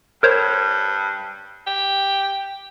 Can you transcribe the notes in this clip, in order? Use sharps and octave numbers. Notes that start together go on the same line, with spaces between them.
G2 A#4 C5 C#5
G4